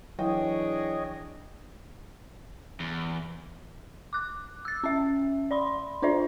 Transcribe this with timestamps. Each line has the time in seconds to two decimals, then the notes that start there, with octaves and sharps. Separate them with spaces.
0.19 E3 F#3 D4 E4 G#4 C#5 D#5 G5
2.80 E2
4.13 D6 F#6
4.65 E6 A6
4.84 C#4 E5
5.51 D5 B5 C6
6.02 D4 F4 C5 D5 E5